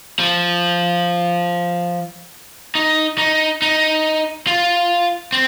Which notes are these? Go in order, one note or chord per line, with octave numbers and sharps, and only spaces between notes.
F3
D#4
D#4
D#4
F4
C4